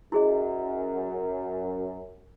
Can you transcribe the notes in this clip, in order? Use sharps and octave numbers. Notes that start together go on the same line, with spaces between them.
F#2 E4 G#4 D#5